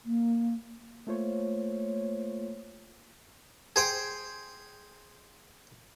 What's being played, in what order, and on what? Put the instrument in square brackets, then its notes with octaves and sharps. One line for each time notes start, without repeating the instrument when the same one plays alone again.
[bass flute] A#3
[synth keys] A3 A#3 F4 C5 C#5
[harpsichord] G#4 C5 G5